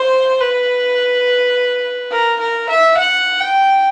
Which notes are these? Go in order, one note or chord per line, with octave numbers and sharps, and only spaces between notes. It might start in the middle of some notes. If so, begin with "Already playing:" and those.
Already playing: C5
B4
A#4
A#4
E5
F#5
G5